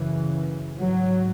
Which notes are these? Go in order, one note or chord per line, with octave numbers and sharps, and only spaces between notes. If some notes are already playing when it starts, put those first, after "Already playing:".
Already playing: F#2 C#3 E3
G#2 F#3